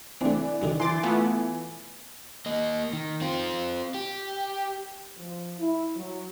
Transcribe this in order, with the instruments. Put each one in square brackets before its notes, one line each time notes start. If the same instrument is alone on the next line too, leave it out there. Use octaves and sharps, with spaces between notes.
[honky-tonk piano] E3 D4 [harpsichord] A3 C4
[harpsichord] F#2 D3 D#3
[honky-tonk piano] E3 [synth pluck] C6 D6 A6
[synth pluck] A3 B3 F4
[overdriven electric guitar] A#3 D#5
D#3
C4 F4
G4
[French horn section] F3
E4
F#3